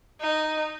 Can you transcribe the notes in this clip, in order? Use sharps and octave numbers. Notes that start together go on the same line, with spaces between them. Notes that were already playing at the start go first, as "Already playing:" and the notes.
D#4